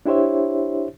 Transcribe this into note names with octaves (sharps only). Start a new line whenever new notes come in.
D4 E4 G4 C5 C#5 E5